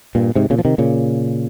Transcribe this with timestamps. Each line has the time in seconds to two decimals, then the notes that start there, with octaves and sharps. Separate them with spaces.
0.15 G2 A#2
0.36 G#2 C3
0.50 A#2 C#3
0.59 F3
0.65 C3 D#3
0.78 A#2 C#3